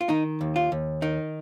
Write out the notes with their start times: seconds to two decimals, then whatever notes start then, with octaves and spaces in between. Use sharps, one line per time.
0.01 F4
0.09 D#3 D#4
0.41 D#2
0.56 F4
0.72 D#2
1.02 D#3 D#4